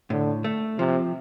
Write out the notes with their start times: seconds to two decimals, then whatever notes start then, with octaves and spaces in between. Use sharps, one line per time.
0.10 A2 D3
0.44 A3
0.78 C3 F3